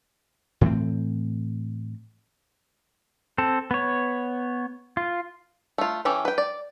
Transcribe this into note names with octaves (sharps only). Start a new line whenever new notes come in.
A2 E3 A3 C4
C4 A4
B3 C#5
F4
A3 F4
E3 C#4 G4 A4
B4 G5
D5